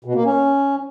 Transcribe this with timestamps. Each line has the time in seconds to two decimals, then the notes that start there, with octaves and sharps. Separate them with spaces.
0.05 B2
0.15 A#3
0.25 C#4